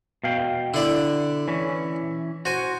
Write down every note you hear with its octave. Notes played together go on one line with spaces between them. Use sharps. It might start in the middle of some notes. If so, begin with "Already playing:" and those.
B2 F5 G5
D3 E4 D5 E5
E3 C#4
F#4 C5 G#5